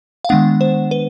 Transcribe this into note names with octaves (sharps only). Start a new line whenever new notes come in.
F5
D#3 G#3 B3 D4 F#5
C5
B4